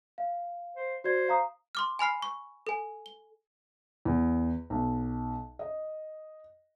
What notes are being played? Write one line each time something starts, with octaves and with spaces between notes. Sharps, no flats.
F5
C5
F#4 C5 D5 G#6
F5 A#5 D#6
C6 D6 F6
G#5 B5 F6 C7
C#6
A4 G#5
G7
E2
B1
D#5